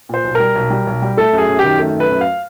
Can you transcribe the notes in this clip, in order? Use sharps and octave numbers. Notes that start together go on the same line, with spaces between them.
A#2 C5
B1
G3 A#4
B1
G3
B1
G3
A3 A4
F#2 G#4
F#2
G4
D#3
A3
F#2
B4
F#2
F5